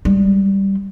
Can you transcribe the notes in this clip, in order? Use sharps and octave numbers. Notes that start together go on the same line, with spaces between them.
G3 G#3